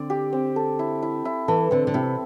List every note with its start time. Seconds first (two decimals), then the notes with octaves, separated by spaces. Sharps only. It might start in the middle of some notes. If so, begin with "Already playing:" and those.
Already playing: D3 C4 D5
0.10 G4
0.33 C4
0.56 A4
0.79 E4
1.02 E4
1.25 E4
1.48 E3 A4
1.71 D3 C4
1.87 D3
1.94 C3 E4